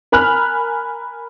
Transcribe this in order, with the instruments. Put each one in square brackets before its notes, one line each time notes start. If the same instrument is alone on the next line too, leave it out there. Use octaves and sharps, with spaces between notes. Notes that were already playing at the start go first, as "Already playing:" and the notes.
[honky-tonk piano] A#4 G#5 B5 F6 F#6